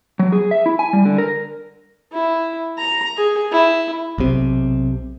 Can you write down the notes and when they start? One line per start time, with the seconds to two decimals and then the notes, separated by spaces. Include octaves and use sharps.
0.19 F#3
0.32 G#4
0.51 E5
0.66 E4
0.79 G#5
0.93 G3
1.05 D3
1.18 A#4
2.12 E4
2.78 A#5
3.17 G#4
3.51 E4
4.18 B1 C3